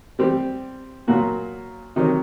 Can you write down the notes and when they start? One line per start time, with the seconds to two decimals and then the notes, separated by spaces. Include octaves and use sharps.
0.19 G3 C4 G4
1.08 A#2 F#3 A#3 F#4
1.96 C3 D#3 F#3